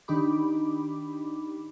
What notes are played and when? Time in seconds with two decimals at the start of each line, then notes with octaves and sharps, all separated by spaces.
0.08 D#3 D4 D#4 G4 B5 D6